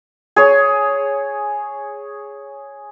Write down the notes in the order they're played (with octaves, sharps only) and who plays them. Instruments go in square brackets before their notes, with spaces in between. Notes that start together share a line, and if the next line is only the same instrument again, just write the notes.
[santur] G#4 C#5